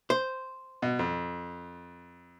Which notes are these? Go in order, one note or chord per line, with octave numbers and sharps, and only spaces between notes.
C5
B2
F2